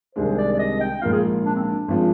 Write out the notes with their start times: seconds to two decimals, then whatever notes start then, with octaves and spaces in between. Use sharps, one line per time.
0.16 C2 C3 D#3 G#3 D4 C5
0.38 D5
0.53 D5
0.59 D#5
0.81 G5
1.01 A#1 G#2 F3 A#3 F4 F5
1.12 G#4
1.45 D4
1.55 C4
1.63 D4
1.88 G#1 F3 G#3